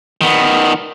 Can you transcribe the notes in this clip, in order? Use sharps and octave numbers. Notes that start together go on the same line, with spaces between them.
D#3 B3